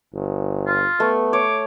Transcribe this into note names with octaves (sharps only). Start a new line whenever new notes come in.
G1
F4
A3 B3
C#5 D6